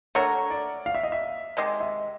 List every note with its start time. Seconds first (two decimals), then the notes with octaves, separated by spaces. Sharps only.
0.15 A3 D4 F#4 A#4 C#5
0.50 D5
0.86 F5
0.95 E5
1.03 D#5
1.12 E5
1.57 C3 D#3 G#3
1.80 E5